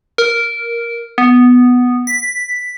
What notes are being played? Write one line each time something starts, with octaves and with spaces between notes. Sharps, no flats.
A#4
B3
B6